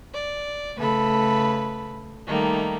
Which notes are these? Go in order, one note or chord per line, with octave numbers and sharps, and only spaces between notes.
D5
C#3 A3 A4 B4 B5
D#3 G3 A3 A#3 D#4